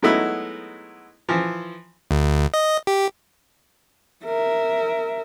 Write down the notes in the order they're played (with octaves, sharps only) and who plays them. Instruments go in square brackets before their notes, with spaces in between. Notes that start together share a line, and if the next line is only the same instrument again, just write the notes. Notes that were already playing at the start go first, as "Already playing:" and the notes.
[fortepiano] F#3 G#3 A3 B3 D#4 E4
E3 F3
[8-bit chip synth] D2
D#5
G4
[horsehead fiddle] A#4 E5